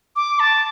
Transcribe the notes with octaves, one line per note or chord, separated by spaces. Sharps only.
D6
A5